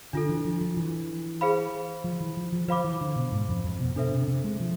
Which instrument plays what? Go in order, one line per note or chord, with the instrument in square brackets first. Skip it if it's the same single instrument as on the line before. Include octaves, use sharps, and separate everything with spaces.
[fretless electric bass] D3 [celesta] D4 F4 A4
[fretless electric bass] E3
F3
F3
E3
[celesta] G#4 C5 F5 B5
[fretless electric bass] F3
E3
F3
F3
[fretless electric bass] F3 [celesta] C5 F5 B5 D6
[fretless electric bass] E3
D3
B2
G#2
F2
F2
B2
[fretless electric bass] B2 [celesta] D4 A4 C5 E5
[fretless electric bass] C3
C3
G#3
F3